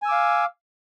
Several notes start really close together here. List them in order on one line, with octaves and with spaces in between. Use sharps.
G#5 E6 D6 F5